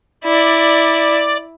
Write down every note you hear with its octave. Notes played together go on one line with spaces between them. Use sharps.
E4 D5